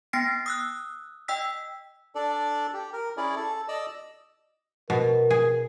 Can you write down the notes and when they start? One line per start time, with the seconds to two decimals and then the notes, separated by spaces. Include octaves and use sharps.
0.13 B3 G5 A#6 C7 D7
0.46 D#6 E6 F#6
1.28 D#5 G5 E6 B6
2.15 D4 A4 D5
2.74 G4
2.93 A#4
3.17 C#4 E4 G#4 D5
3.36 A4
3.68 D5 D#5 E6
4.90 B2 A#4
5.31 G#4